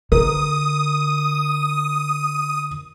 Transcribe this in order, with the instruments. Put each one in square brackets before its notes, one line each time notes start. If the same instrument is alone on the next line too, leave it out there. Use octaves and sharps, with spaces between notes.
[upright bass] D3 [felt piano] A#4 [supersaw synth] D#6